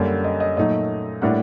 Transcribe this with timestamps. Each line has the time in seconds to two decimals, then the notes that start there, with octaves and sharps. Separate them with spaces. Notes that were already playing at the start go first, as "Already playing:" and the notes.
Already playing: F#2 D3 G3 A#3
0.24 D#5
0.40 D#5
0.57 A#2 F#3 A3 D#4 D#5
1.22 A2 G3 A#3 D4 F#5